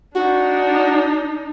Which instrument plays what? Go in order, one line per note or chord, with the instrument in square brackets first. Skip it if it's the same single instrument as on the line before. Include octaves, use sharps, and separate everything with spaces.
[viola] D4 D#4 [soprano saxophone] F#4